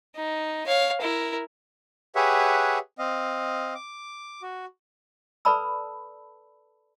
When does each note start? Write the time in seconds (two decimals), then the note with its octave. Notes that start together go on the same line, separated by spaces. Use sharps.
0.16 D#4
0.66 C#5 F5
1.01 E4 A#4
2.15 G4 G#4 B4 C#5 E5 F#5
2.99 C4 D#5 F5
3.75 D6
4.42 F#4
5.45 A4 B4 D5 A5 B5 E6